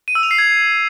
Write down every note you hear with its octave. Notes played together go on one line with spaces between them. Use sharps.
D#7
E6
F7
C7
G#6